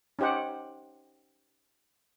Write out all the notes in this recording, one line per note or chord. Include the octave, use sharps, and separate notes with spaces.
C#4 D#4 G4 C5 F#5